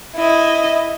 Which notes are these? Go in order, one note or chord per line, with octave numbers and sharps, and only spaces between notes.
E4 D#5